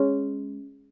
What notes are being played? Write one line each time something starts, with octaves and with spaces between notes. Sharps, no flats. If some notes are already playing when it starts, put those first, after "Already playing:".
Already playing: G#3 C#4